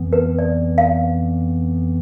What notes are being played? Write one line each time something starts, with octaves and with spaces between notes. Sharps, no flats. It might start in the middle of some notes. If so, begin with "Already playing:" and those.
Already playing: F2 E3 B3
B4
D5
F5